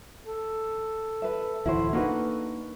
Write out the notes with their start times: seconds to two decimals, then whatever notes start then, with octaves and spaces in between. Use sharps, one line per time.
0.24 A4
1.22 B4 E5
1.66 D1 E2 E4 F#4 C5
1.93 A#3 D4 D#4 F#4 B4